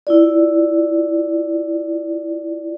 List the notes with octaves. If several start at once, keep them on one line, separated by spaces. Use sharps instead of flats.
E4 F4 D5